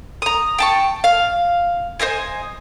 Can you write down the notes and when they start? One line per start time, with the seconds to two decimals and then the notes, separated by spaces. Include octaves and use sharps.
0.22 A#5 D#6
0.59 G5 A5 C#6
1.04 F5
2.00 C5 C#5 D#5 G#5